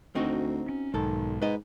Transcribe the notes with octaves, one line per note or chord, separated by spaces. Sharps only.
D2 C4 D#4 F#4
C#4
B1 G#2 D#3 A4
G#2 B4 D#5